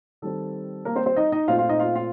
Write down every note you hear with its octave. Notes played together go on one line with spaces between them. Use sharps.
D#3 G3 C4 A4
A#3 A#4
C4 C5
C4 C5
D#4 D#5
D#4 D#5
A#2 A3 C4 F4 F5
F4 F5
D#4 D#5
F4 F5
F4 F5